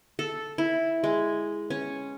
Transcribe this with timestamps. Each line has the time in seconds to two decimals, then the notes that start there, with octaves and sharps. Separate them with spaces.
0.19 A4
0.58 E4
1.04 G#3
1.70 C#4